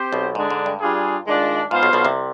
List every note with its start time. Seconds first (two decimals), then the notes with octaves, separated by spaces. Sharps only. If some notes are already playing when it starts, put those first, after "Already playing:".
Already playing: C4 G4 C5
0.13 B1 B2
0.35 G#2 D3 G#3 D4
0.50 G#2
0.66 G2
0.81 G3 D4 F4 G#4
1.26 D#3 G#3 D4 F4
1.71 G#2 B3 F4 C5 F5
1.83 B1 B2
1.93 B1 B2
2.05 C2 C3